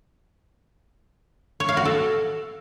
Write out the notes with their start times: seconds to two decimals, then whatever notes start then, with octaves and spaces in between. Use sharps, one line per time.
1.60 C#5
1.69 F5
1.77 F#4
1.85 A4